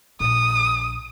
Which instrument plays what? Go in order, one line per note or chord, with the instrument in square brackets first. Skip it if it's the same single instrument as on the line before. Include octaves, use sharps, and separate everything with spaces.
[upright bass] A#1 [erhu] D#6